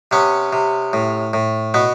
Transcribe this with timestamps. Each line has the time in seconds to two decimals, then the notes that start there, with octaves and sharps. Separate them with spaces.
0.11 C3 B3 C#4
0.53 C3
0.93 A2
1.33 A2
1.74 B2 B3